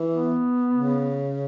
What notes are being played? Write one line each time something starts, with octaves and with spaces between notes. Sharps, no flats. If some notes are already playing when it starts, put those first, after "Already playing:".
Already playing: E3
B3
C#3